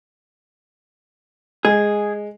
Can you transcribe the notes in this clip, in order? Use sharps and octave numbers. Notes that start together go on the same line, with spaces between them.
G#3 G#4